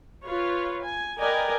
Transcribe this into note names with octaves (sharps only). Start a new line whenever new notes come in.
F4 B4 C#5
G#5
A#4 B4 D5 D#5 G5 G#5